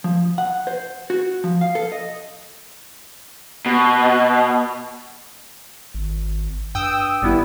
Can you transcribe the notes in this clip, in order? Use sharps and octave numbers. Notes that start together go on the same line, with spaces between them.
F3
F#5
C5
F#4
F3
F5
A4
D#5
B2
G#1
G2 G5 D#6 E6
G#1 G3 B3 E4